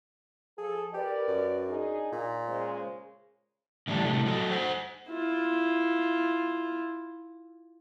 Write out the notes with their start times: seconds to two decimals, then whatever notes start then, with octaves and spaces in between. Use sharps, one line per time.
0.58 F3 G#4 A4
0.94 G4 A#4 B4 D5
1.28 F#2
1.69 D4 D#4 G#4
2.12 A#2
2.47 C#3 G#3 C5
3.88 A2 D3 E3 G3 D4
4.04 A2 C3 A3
4.25 F#3 F#4 A4
4.51 C5 F#5
5.09 E4 F4